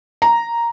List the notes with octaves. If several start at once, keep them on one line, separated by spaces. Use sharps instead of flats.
A#5